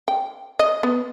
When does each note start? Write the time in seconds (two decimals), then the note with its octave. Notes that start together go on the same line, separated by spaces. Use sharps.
0.08 G5
0.59 D#5
0.83 B3